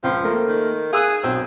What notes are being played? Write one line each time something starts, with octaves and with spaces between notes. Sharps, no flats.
C#2 F3
A3 A#3 A#4
D#3
G#4 F5 E6 F#6
B1 C4